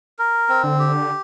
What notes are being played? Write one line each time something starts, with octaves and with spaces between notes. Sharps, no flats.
A#4
C4
D3
G4